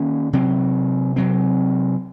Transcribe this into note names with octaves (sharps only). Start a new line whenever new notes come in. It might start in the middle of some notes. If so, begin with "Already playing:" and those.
Already playing: D#3 A#3 C#4
C3 F#3 C4
C3 F#3 C4